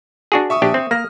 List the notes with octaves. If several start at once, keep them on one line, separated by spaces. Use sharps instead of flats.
D4 F#4 G#4
E5 C#6 D#6
A#1 D4 G4
C4
A#3 F6 A#6